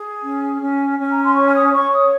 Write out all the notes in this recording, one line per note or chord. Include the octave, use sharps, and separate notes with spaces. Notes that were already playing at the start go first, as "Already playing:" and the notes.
Already playing: G#4
C#4
C#4
C#4
A#5
C6
C#5 C#6
F6
D#6
C#5 C#6
D#6